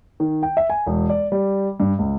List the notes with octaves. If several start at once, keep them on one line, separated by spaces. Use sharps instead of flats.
D#3
G5
E5
G#5
E1
D5
G3
G2
C#2